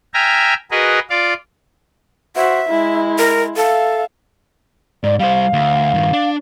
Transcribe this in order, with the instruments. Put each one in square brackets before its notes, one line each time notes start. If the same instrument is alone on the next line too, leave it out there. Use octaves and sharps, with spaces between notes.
[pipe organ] E5 G5 G#5 A#5 F6
F#4 G#4 A#4 B4 D#5
F4 D5 F5 D6
[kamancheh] F#4 C5 [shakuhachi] E5
[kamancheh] G#3 E4
[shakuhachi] A#4
[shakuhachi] A4 [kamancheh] E5 F5
[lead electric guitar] G#2 [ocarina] D5
[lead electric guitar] G3 C5 [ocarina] F5
[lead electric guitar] D2
G2 D#3
D4